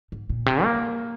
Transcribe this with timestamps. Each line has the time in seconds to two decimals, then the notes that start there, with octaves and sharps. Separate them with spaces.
0.12 G#2
0.29 A#2
0.46 C3
0.64 A#3